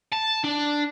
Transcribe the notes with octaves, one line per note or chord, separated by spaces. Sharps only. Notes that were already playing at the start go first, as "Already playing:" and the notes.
A5
D4